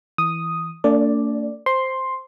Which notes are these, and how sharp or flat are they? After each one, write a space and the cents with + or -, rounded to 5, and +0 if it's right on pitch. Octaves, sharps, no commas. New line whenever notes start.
E3 +0 D#6 +0
A3 +45 D4 -35 D5 +0
C5 +0 C6 +5